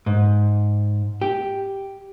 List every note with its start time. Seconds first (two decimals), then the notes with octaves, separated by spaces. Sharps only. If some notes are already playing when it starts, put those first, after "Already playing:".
0.06 G#2
1.21 G4